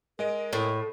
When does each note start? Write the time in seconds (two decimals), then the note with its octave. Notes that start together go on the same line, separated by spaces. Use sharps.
0.19 G#3 A#4 D#5 D7
0.53 A2